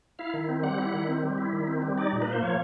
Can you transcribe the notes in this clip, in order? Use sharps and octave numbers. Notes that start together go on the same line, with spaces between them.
E4 F5
D#3
C4
G3 F#5
E4
D#3
C4
G3
E4
D#3
C4
G3
D#4 D5
A#2
B4
A#3 C5
F3 C#5